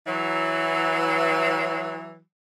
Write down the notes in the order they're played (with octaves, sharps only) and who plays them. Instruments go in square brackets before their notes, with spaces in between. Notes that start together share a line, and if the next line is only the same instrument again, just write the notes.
[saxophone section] E3 F#3